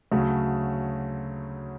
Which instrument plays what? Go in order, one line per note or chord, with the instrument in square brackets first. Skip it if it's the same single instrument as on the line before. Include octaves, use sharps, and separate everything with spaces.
[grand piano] D2 C#3 F#3 A3